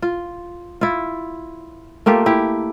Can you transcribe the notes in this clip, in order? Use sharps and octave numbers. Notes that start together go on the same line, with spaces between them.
F4
E4 F4
A3 A#3 F4 G4
E4 G4